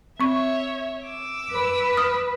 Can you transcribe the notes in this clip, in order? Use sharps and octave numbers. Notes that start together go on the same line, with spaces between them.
C4 C#5 E5 C#6
D6 E6
B4
D#6 F6